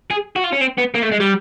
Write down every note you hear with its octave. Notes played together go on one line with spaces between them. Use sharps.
G#4
F#4
F4
C#4
C4
B3
A#3
A3
G#3
G3